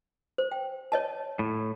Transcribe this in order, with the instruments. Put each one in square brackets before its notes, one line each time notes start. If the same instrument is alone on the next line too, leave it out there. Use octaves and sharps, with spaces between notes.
[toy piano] C5
G5
C#5 D#5 A5
[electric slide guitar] A2